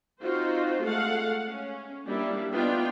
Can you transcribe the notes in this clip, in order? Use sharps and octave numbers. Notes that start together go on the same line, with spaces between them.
C4 D#4 F4 F#4 C5
G#3 A3 A4 F5 F#5
C#4
G3 A#3 D4 E4
B3 D4 D#4 F4 G5